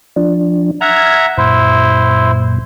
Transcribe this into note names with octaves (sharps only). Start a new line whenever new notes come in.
F3 D4
E5 F#5 A#5 F6 G#6
F#2 A#2 E4 C5